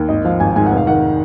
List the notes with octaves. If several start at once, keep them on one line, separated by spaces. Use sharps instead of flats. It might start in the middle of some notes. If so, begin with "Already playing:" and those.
Already playing: D#2
G#1 D#5
F3 F5
G#1 G#5
G#2 G#5
F#5
F1
F5
D#3 F#5